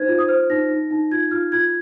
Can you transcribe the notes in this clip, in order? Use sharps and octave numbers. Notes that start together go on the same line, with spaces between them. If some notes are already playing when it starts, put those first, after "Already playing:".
Already playing: D#4 C5 G#6
F4
D#6
C5 F6
D#4 A#6
D#4
D#4
F4 G#6
F4 F6
F4 G#6